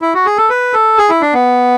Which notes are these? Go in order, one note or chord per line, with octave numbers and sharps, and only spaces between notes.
E4
F#4
G#4
A4
B4
A4
G#4
E4
D4
B3